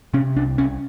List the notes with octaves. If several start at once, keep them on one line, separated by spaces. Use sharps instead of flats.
C3 C#4
C2 D4
C2 C#4